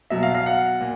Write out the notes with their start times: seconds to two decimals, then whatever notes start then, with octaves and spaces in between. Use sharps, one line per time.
0.10 B2 F#3 E5
0.23 F5
0.35 F5
0.46 F#5
0.81 A#2